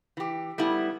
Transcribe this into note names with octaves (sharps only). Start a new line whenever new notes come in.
E3 G4
G3 A3 B3 E4